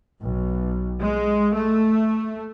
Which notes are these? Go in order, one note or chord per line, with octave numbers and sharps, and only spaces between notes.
B1
G#3
A3